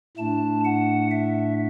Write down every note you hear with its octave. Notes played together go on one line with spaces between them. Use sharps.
A2 A3 D4 A5
F#5
E5